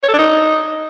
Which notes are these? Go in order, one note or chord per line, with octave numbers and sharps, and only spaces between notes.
C#5
A4
D4
D#4